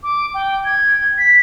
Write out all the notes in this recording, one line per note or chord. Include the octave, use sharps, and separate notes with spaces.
D6
G5
G#6
B6